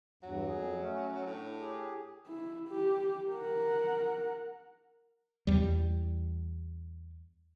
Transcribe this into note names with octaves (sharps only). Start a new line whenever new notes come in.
E2 G2 F#3
F2 G#4
A3 C#4
A2 D4
G4 G#4
E4
G4
A#4 F#5
E2 G3